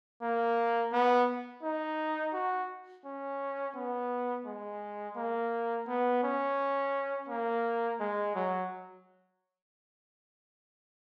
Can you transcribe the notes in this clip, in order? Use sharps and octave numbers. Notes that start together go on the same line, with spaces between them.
A#3
B3
D#4
F#4
C#4
B3
G#3
A#3
B3
C#4
A#3
G#3
F#3